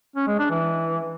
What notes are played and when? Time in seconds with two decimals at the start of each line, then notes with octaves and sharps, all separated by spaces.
0.16 C#4
0.27 G#3
0.39 D4
0.50 E3